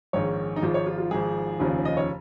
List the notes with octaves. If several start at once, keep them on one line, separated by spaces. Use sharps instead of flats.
A#1 G#2 D#3 C#5
D#4
G#1 G#2 F3 F4
C#5
F4
F4
G#1 G#2 F3 G#4
F1 D#2 C#3 F3
D#5
C#5